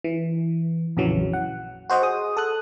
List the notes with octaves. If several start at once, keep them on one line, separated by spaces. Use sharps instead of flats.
E3
A#1 F2 C#3 E3 F#3
F#5
F#4 C5 D#5 F#5
G#4 D#6
A4 D#6 F#6